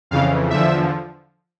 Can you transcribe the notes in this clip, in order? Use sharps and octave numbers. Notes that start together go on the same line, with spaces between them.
F2 C#3 E3 F5
E2 D3 F3 E5